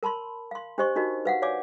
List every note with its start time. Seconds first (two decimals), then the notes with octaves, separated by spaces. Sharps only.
0.03 A#4 A5 B5 C6
0.51 F5 C6
0.78 D4 G4 C5 D#5 C6 C#6
0.96 D4 D#4 F#4 A#4 D#5
1.25 B4 F5 F#5
1.42 C#5 D5 F5 G#5 D6